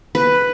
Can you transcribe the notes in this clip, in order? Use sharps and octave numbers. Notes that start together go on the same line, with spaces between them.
B4